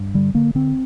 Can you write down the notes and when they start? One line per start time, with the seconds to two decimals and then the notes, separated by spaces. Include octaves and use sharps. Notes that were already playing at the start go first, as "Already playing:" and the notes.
Already playing: G2
0.14 D3 G3
0.34 D3 A#3
0.55 D3 C4